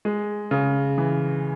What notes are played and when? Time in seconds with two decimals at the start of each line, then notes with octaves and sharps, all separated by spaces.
0.05 G#3
0.51 C#3
0.98 E3